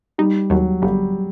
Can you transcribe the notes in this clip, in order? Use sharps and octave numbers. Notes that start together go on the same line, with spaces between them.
G3 D#4
D#2 F#3
G1 G3